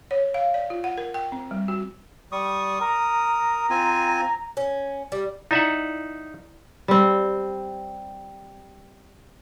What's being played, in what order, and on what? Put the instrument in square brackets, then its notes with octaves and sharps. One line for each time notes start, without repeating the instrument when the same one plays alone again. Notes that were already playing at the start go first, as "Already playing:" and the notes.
[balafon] C#5
F5
D5
F4
F#5
A#4
G5
C4
G3
F#4
[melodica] G3 C#6 D#6
[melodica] A#4 D#6 [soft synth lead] A#5
[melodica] C4 F4 G#5
[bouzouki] C#4
G3
[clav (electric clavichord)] D#4 E5 F#5 [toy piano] E4 D5 A#5
[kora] G3 C4